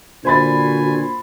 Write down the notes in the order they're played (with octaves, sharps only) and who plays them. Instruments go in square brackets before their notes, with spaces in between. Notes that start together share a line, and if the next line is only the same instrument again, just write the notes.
[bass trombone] A#2 [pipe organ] D3 G#5 [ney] F#4 [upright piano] C5 B5 A6